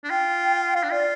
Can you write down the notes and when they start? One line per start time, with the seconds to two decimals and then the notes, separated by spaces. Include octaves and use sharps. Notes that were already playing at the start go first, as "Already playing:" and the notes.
0.04 D4
0.10 F4 G5
0.67 G5
0.75 F4 F5
0.83 D4
0.92 F4 D5